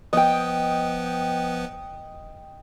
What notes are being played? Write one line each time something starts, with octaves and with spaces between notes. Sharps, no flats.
F3 B3 B4 D#5 G5